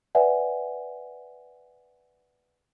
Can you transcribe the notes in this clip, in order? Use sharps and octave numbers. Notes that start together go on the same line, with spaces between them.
B4 D5 E5 F#5 G#5